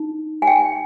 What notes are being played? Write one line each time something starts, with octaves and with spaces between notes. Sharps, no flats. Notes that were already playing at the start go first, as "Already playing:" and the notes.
Already playing: D#4
G#5
G5